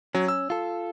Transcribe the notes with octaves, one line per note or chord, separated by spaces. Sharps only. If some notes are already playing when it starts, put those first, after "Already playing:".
F#3 C#4
E6
F4 A4